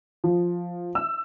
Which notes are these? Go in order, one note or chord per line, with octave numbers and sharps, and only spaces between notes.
F3
E6